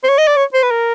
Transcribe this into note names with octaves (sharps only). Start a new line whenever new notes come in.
C5
C#5
D#5
D5
C#5
C5
B4
A#4